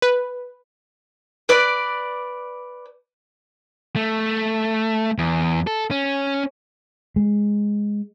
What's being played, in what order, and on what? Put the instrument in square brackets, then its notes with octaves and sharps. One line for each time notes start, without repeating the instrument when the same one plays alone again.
[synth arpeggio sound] B4
[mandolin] B4 D5
[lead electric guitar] A3
E2
A4
C#4
[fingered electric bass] G#3